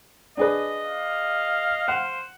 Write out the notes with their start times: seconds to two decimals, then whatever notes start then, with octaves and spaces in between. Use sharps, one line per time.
0.37 D4 G#4 B4 D#5
0.83 F5
1.88 C5 F#5